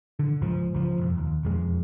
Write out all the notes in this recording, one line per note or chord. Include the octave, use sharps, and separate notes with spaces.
D3
C#2 G#2 F3
C#2 F3
E1 F2
D#2
E1 F2 G#3